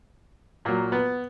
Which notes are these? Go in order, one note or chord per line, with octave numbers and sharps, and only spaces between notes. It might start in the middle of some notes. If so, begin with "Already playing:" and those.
A#2 F#3 A#3
B3